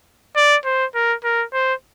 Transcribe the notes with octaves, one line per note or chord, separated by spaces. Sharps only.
D5
C5
A#4
A#4
C5